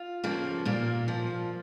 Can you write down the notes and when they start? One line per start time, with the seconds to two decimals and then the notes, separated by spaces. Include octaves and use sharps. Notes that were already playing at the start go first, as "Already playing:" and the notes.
Already playing: F4
0.24 C#3 F3 A#3
0.65 A#2 A#3
1.08 F3